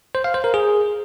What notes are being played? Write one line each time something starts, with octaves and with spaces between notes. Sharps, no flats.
C5
F5
C5
A#4
G#4